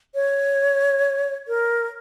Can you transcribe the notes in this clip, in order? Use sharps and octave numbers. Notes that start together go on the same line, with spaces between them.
C#5
A#4